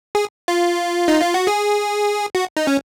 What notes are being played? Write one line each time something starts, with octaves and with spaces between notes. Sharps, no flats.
G#4
F4
D#4
F4
F#4
G#4
F#4
D#4
C#4